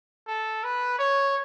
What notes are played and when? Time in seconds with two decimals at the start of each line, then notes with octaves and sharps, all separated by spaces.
0.28 A4
0.64 B4
0.99 C#5